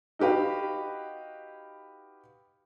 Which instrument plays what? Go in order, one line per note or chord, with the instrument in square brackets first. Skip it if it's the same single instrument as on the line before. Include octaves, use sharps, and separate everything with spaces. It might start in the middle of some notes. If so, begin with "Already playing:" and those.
[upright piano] D#4 F#4 G4 B4 F5